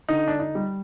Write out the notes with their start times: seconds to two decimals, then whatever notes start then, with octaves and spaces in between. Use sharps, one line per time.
0.09 D3 D#4
0.28 D4
0.40 D#4
0.55 G3